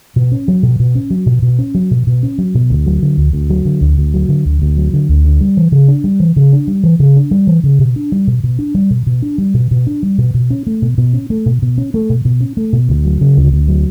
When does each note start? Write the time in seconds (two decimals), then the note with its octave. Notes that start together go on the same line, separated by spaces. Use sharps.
0.16 B2
0.32 C#4
0.48 F#3
0.63 B2
0.80 B2
0.95 C#4
1.10 F#3
1.26 B2
1.42 B2
1.59 C#4
1.75 F#3
1.91 B2
2.07 B2
2.23 C#4
2.38 F#3
2.55 B2
2.70 D2
2.86 F#3
3.02 D3
3.17 D2
3.33 D2
3.50 F#3
3.65 D3
3.81 D2
3.98 D2
4.14 F#3
4.29 D3
4.45 D2
4.62 D2
4.77 F#3
4.94 D3
5.09 D2
5.25 D4
5.41 G3
5.57 E3
5.72 C#3
5.88 D4
6.04 G3
6.20 E3
6.36 C#3
6.53 D4
6.67 G3
6.83 E3
7.00 C#3
7.16 D4
7.31 G3
7.47 E3
7.63 C#3
7.79 B2
7.96 D4
8.12 G3
8.27 B2
8.44 B2
8.59 D4
8.75 G3
8.90 B2
9.06 B2
9.22 D4
9.38 G3
9.54 B2
9.71 B2
9.87 D4
10.03 G3
10.18 B2
10.34 B2
10.50 C#4
10.67 A3
10.82 B2
10.98 B2
11.13 C#4
11.30 A3
11.46 B2
11.62 B2
11.78 C#4
11.94 A3
12.10 B2
12.25 B2
12.41 C#4
12.57 A3
12.73 B2
12.89 D2
13.05 F#3
13.21 C#3
13.37 D2
13.52 D2
13.68 F#3